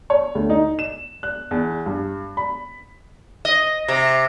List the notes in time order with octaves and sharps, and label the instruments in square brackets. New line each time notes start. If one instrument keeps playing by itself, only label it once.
[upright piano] C#5
D2
D#4
E7
F#6
E2
G2
B5
[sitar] D#5
C3